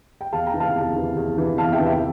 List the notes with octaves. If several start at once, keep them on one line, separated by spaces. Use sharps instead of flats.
G5
E2 F5 A5
G5 A#5
C3 E3
F5 A5
E2
C3 E3
E2
C3 E3
E2 F5 A5
E5 G5
C3 E3
E5 G5